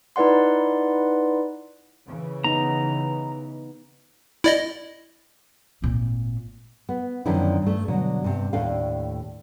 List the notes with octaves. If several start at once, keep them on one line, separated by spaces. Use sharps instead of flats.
D#4 E4 B4 D5 F#5 C6
C#3 E3
B3 D#4 A#5
E4 D5 D#5
G#1 A#2
B3
F#2 D3 D#3 F3 D4 E4
G2 A3
B2 D3 F#3
G2 C3
D#2 A2 A3 D4 A4 F5